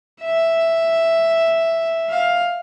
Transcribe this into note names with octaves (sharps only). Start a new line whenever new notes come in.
E5
F5